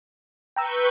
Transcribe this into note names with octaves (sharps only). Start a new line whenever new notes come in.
B4 G5 A#5 C#6 E6 G6